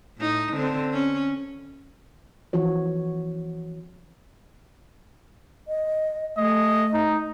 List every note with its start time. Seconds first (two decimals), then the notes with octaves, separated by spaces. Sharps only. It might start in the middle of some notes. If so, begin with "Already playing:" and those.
0.18 A2 D#4
0.54 D3 C4
0.93 C#4
2.53 E3 F3 F#4 C#5
5.68 D#5
6.37 A3 D#5
6.93 D#4